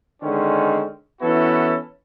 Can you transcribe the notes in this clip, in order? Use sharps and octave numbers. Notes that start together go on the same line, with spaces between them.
D3 D#3 G#3 C4 C#4
E3 B3 C#4 E4 F#4 A4